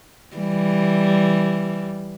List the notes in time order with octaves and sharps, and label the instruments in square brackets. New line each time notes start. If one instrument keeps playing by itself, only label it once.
[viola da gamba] E3 G3